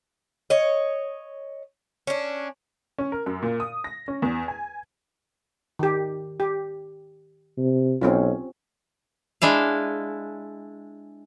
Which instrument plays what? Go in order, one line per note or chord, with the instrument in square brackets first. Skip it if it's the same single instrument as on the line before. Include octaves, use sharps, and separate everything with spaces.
[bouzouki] C#5 D#5
C#4 D4
[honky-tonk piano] C#4
A#4
F#2
A#2
D#6
A#6
C#4
E2
G#5
[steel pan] D#3 G4
G4
[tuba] C3
[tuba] B1 [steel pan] C4 C#4 F4
[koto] G#3 D4 E4 F5